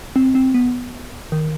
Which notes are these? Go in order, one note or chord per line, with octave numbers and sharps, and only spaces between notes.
C4
C4
B3
D#3